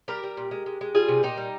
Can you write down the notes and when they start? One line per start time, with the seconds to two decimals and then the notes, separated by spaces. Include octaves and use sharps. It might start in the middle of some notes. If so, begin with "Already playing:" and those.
0.08 G3 G4 A#4
0.24 G3
0.37 A#2
0.51 G#3
0.66 G#3
0.81 G#3
0.95 G3 F4 G#4
1.08 C3
1.23 A#2 D#4 G4
1.37 G3